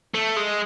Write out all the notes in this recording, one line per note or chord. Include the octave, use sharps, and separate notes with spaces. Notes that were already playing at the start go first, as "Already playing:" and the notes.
A3
G#3